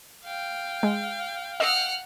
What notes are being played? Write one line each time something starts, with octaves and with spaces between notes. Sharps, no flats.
F5 G5
G#3
D#5 F#5 E6 F6